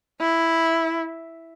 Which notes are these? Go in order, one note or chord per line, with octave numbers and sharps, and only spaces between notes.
E4